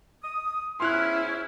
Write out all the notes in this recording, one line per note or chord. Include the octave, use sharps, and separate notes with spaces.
D#6
G#2 B3 C#4 E4 C6 F6 F#6